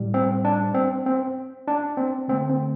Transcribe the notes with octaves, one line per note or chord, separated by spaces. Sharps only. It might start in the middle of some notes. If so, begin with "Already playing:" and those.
Already playing: A2 G3
C4
D4
C4
C4
D4
C4
D3 A3 C4
C4